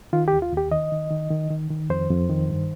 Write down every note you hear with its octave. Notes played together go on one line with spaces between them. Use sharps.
D#3 F4
D#2 G4
F4
D#2
G4
D#3 D#5
D#3
D#3
D#3
D#3
D#3
F2 C5
F2
D#3
G2